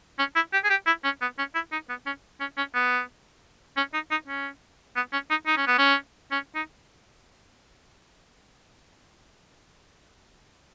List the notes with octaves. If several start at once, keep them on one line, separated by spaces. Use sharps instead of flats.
C#4
E4
G4
G#4
G4
E4
C#4
B3
C#4
E4
D#4
B3
C#4
C#4
C#4
B3
C#4
D#4
D#4
C#4
B3
C#4
D#4
D#4
C#4
B3
C#4
C#4
D#4